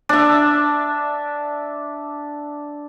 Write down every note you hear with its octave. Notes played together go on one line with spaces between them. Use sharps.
D4 E5